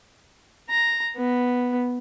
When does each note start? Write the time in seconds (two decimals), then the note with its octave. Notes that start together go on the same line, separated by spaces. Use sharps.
0.70 A#5
1.17 B3